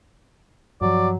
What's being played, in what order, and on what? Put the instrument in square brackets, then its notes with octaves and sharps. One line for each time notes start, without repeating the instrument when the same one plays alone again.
[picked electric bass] G2 F3 [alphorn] F#3 [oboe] D5